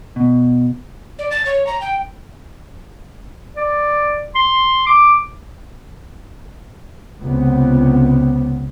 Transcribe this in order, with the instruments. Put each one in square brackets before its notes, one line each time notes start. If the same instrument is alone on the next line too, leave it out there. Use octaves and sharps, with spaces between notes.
[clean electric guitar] B2
[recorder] D5
A6
C#5
A#5
G5
[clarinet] D5
C6
D6
[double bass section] C#2 C3 B3